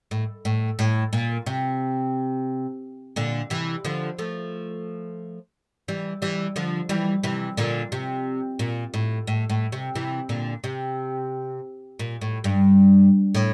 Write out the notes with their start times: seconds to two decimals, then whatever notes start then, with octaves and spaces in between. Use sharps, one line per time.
0.11 A2
0.45 A2
0.79 A2
1.13 A#2
1.46 C3
3.16 A#2 D3
3.50 C3 E3
3.85 D3 F3
4.19 F3 A3
5.88 E3 G3
6.22 E3 G3
6.56 D3 F3
6.89 E3 G3
7.23 C3 E3
7.57 A#2 D3
7.92 C3
8.59 A#2
8.94 A2
9.27 A2
9.50 A2
9.72 C3
9.95 C3 E3
10.29 A#2 D3
10.64 C3
11.99 A#2
12.21 A2
12.44 G2
13.35 A2